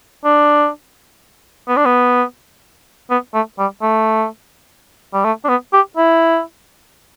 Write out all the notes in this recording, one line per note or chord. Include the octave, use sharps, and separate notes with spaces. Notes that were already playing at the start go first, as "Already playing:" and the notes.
D4
B3
D4
B3
B3
A3
G3
A3
G3
A3
D4
B3
G4
E4